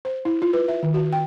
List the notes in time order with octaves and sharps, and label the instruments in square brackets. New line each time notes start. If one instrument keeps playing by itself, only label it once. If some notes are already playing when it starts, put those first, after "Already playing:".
[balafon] C5
E4
F4
B4
E5
D#3
F#4
G5